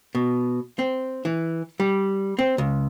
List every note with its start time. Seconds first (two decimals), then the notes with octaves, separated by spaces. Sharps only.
0.15 B2
0.79 C4
1.25 E3
1.80 G3
2.39 C4
2.58 C#2